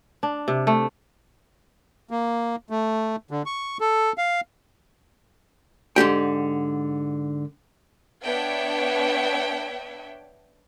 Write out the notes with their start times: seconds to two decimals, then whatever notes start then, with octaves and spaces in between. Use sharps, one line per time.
0.23 D4
0.48 C3
0.67 A3
2.11 A#3
2.70 A3
3.31 D3
3.46 C#6
3.80 A4
4.18 F5
5.96 G#2 D3 G4 G5
8.23 B3 D4 C#5 E5 G5